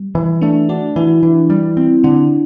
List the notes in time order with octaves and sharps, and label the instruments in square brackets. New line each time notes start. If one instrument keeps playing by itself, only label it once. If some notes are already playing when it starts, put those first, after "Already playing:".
Already playing: [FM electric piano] G3
[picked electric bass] E3
[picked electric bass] A3 [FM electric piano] D4
[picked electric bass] D4 [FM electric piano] F#4
[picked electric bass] E3 [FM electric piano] E4
[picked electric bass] E3
G3
C4
[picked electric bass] D3 [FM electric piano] D4